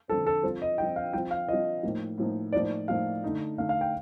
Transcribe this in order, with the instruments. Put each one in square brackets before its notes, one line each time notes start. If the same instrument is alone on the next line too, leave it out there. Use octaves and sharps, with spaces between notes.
[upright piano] D3 F3 C4 [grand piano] A4
[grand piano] A4
[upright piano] F3 C4 F4 [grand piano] C5
[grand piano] D#5
[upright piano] F3 C4 F4 [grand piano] G5
[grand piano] F5
[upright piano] F3 C4 F4 [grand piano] G5
[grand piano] F5
[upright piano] F3 C4 F4 [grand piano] D#5
[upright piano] A2 F3 A#3 D#4
A2 F3 A#3 D#4
[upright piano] A2 F3 A#3 D#4 [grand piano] D5
[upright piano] A2 F3 A#3 D#4 [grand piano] F5
[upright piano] D3 A3 D#4
[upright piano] D3 A3 D#4 [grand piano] F5
[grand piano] F5
G5